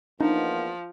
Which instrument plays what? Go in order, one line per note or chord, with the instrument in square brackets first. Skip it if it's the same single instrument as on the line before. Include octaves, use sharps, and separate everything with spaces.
[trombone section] E2 A#3 B3 [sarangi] F3 [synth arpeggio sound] D4 [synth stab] D#4